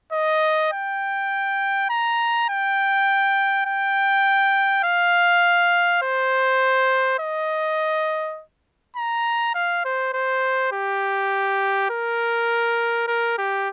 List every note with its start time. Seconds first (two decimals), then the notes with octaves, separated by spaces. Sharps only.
0.12 D#5
0.72 G5
1.90 A#5
2.49 G5
3.66 G5
4.83 F5
6.02 C5
7.19 D#5
8.96 A#5
9.54 F5
9.85 C5
10.14 C5
10.72 G4
11.90 A#4
13.07 A#4
13.38 G4